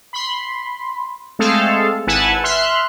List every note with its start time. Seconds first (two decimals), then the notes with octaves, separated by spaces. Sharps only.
0.13 B5 C6
1.39 G#3 A3 C4 G#4 A4 F5
2.07 G#1 E4 B4 F#5 G#5 A5
2.44 E5 C6 F6 F#6